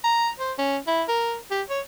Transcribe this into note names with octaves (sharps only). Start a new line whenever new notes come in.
A#5
C5
C#4
E4
A#4
G4
C#5